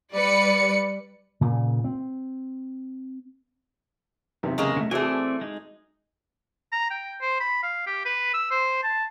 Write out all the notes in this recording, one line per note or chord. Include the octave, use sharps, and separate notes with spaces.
G3 B4 D5 C#7
A#2 C#3
C4
B1 E2 C3
C#3 G#3 A#3
D3 A3
E3 A3 C4 F#4 G#4 D5 G#5
G#3 D#4
A#5
G5
C5
B5
F5
G4
B4
E6
C5
A5